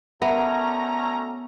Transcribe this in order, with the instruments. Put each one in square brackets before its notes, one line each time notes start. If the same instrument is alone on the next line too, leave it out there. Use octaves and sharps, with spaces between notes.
[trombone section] D2 A3 C#4 [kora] B3 [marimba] A#4 E5 [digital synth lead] A#5